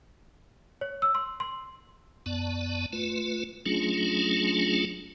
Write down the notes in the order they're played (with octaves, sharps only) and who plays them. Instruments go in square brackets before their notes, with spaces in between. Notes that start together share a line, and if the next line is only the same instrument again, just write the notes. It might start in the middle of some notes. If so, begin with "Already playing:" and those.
[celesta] C#5
E6
C6
C6
[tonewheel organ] F#2 B3 D5 A5
A3 F4 B4
F#3 A3 C#4 D4 F4 G#4